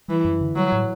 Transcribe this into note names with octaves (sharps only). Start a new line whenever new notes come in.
E3 G3
F#2
D3
F#3 G3
A2